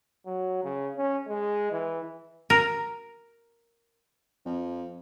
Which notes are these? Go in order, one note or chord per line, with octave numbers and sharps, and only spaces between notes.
F#3
C#3
C#4
G#3
E3
A#4
F2